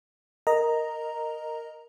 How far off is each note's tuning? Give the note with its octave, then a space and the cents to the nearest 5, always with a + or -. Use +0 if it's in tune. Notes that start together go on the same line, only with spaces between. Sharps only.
A#4 +0 D#5 +0 A#5 +0